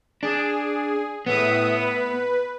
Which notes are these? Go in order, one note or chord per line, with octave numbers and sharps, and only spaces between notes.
D4 G#4
A2 B3 E5 D#6
B4